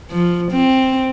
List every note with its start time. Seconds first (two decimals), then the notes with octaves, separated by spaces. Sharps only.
0.11 F3
0.51 C4